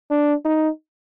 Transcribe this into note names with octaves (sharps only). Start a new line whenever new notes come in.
D4
D#4